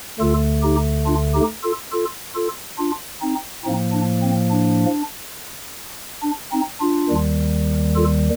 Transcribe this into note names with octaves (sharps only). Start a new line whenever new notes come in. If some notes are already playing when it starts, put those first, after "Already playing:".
D2 D3 A3 F4 A4
D#4 G4
D4 F4
D#4 G4
F4 A4
F4 A4
F4 A4
D4 F4
C4 D#4
A2 F3 A#3 C4 D#4
D4
C4
D4
D4
C4 D#4
D4 F4
D#2 D#3 G3
F4 A4